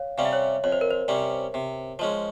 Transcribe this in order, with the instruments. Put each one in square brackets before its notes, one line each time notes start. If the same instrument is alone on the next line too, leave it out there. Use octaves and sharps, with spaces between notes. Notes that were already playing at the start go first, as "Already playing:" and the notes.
Already playing: [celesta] C#5 F5
[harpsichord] C3 G3 C#4 [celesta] F5
[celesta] E5
C#5
[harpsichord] F2 [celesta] C#5
[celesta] C5
A#4
C5
[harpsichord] C3 G3 C#4
C3
F3 G#3 C#4